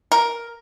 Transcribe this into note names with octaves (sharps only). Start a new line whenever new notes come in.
A#4